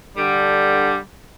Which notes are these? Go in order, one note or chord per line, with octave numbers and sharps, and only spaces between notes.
D3 G3